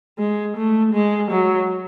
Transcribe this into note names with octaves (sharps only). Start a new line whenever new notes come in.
G#3
A3
G#3
F#3